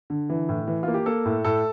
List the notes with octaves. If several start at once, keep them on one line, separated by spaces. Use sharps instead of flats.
D3
E3
A2
E3
A#3 F4
G4
A#3 A4
A2
A2 A4